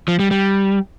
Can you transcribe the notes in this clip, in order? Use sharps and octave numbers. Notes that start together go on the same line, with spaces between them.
F3
G3
G3